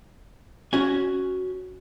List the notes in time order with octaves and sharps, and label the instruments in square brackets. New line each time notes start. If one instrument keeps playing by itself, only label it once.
[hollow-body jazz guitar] C#4 F#4 G#5